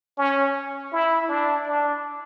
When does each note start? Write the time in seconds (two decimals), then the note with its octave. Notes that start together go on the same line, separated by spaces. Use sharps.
0.18 C#4
0.92 E4
1.29 D4
1.67 D4